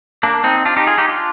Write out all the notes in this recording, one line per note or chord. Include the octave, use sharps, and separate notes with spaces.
A#3 D4
C4 D#4
D4 F4
D#4 G4
F4 G#4
D#4 G4
D4 F4